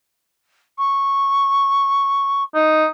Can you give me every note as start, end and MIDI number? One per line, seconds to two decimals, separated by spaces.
0.78 2.43 85
2.55 2.86 63